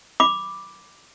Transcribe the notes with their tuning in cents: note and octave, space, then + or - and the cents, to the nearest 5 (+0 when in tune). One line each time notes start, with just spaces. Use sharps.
B5 +0 D6 +0